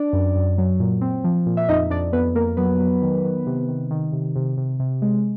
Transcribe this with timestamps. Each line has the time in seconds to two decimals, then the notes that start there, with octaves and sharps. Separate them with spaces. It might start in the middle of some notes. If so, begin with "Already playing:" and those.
Already playing: D4 D5
0.13 F#2
0.35 F#2
0.58 F#3
0.80 A#2
1.01 C4
1.24 F3
1.46 A#2
1.57 E5
1.69 F2 D#4 D#5
1.90 F2 D4 D5
2.13 F2 B3 B4
2.35 F2 A#3 A#4
2.57 F#3 B3 B4
2.80 F#3
3.02 D#3
3.24 D#3
3.46 C3
3.69 D#3
3.91 D#3
4.13 C3
4.36 C3
4.57 C3
4.80 C3
5.02 G#3